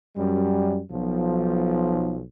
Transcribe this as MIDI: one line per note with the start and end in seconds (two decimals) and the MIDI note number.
0.16 0.80 42
0.16 0.80 55
0.91 2.23 35
0.91 2.23 53